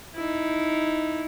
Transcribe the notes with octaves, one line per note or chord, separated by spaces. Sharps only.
D#4 E4